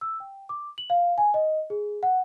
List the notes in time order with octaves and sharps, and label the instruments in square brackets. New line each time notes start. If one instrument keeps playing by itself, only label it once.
[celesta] E6
G5
D6
F#7
F5
G#5
D#5
G#4
F#5